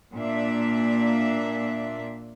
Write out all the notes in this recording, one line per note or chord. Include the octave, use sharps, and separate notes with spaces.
A#2 A#3 D4 E5